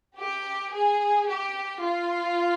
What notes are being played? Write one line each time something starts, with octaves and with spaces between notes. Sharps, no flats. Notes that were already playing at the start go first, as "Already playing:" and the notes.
G4
G#4
G4
F4